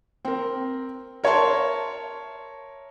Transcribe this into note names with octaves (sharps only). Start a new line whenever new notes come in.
C4 A#4
A#4 C#5 E5 A5 C6